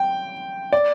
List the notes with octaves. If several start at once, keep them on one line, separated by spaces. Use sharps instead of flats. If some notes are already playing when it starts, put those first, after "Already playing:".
Already playing: G5
D5